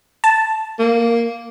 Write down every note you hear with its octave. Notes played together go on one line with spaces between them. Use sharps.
A5
A#3